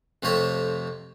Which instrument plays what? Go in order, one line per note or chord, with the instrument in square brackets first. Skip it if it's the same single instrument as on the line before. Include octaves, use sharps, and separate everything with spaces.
[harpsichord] F2 C3 A3 C#5 E5